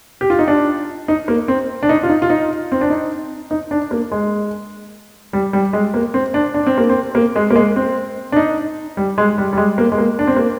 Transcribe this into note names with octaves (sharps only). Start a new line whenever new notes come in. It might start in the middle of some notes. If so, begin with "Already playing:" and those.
G4
F4
D#4
D4
D#4
A#3
C4
D4
D#4
F4
D#4
F4
D#4
C4
D4
D#4
D#4
D4
A#3
G#3
G3
G3
G#3
A#3
C4
D4
D4
C4
A#3
C4
A#3
G#3
A#3
G#3
C4
D4
D#4
G3
G#3
G3
G3
G#3
A#3
G#3
A#3
D4
C4
A#3